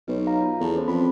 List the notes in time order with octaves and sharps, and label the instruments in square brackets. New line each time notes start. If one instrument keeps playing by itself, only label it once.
[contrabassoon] B1 [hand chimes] D#4 B4 C#5
[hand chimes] F5 A#5
F4
[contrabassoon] E2 [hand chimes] A4 B4 A5
[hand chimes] C#4 C5
[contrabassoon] F2 [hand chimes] B5